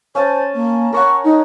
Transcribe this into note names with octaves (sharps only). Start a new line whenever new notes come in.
C#4 C5 G#5 A5
A#3
A#4 C#5 F#5 C#6
D#4